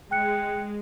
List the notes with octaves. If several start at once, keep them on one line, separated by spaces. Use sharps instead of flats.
G#3 G5 F#6 C#7